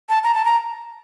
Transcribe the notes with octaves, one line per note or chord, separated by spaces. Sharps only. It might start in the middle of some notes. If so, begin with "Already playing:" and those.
A5
A#5
A5
A#5